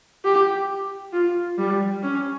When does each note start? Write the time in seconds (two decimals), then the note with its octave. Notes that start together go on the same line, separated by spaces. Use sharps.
0.25 G4
1.14 F4
1.58 G3
2.03 C#4